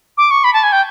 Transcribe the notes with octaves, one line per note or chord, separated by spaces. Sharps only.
D6
C#6
B5
A5
G#5
G5